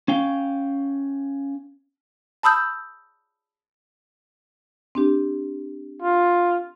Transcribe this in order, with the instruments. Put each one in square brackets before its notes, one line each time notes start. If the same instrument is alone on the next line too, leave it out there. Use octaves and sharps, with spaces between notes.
[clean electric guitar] C#4 F5 G5
[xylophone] A5 B5 D#6 E6 G6
[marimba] C4 D4 G4
[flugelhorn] F4